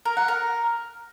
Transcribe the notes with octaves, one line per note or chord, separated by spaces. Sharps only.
A#4
F#5
A#4